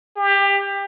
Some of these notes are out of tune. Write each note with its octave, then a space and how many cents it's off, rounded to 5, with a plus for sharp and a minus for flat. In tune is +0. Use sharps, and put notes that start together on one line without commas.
G4 +25